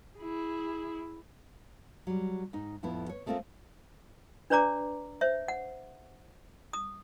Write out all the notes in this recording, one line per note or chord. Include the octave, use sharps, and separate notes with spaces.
E4 G#4
F#3 G3
G#2 D#4
F2 A2 F3 B3 E4
C#5
G#3 A3 C4 F4 A#4 D#5
D4 B4 C#5 D5 A#5 D6
C5 C#5 E5
F#5
D#6